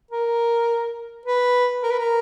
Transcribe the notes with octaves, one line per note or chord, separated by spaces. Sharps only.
A#4
B4
A#4
B4
A#4